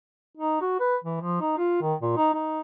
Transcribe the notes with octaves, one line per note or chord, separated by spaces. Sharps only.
D#4
F#4
B4
E3
F3
D#4
F4
D#3
A#2
D#4
D#4